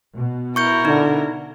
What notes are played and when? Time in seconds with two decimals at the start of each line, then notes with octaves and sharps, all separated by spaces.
0.16 B2
0.56 E4 A#4 C#6 G6 C#7
0.85 D3 D#4